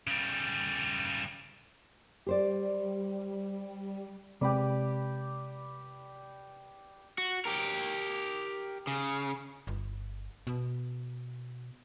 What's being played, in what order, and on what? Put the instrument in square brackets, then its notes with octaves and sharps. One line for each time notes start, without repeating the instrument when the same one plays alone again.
[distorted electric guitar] C#3 G3
[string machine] G3 [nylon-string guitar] G4 C5 D5
[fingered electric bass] C3 G#3 C4 [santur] G4 B4 D5
[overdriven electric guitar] F#4
G4 A#4
C#3
[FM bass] G1
B2